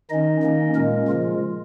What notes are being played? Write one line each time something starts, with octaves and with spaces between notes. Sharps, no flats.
D#3 C#4 D#4 D#5
D#3 A#3 C#4
A#2 G#3 A#3 C#4 A#4
C#3 F3 G#3 F4